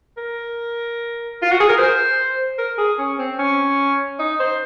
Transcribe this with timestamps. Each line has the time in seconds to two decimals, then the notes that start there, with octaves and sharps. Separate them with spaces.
0.17 A#4
1.42 F4
1.52 F#4
1.60 G#4
1.69 A#4
1.78 C5
2.59 A#4
2.78 G#4
2.98 C#4
3.19 C4
3.39 C#4
4.19 D#4
4.40 C5